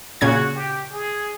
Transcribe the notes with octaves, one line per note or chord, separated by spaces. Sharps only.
A#2 C#3 F#4 G#6
G4
G#4